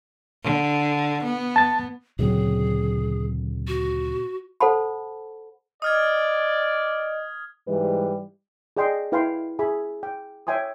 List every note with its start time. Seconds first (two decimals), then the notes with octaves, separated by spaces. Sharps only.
0.44 D3
1.24 B3
1.56 A5 A6
2.19 D2 A#2 C#3 F#3 C4 G#4
3.67 F#4
4.60 A4 C5 F#5 A5 B5
5.82 D5 D#5 D#6 F6 G#6
7.66 G#2 E3 G3 B4
8.77 G#4 D5 D#5 G5 C6
9.12 E4 B4 F5 G5 G#5 C6
9.59 G#4 E5 G#5 B5
10.03 G5
10.47 C#5 E5 G5 G#5 C6 D#6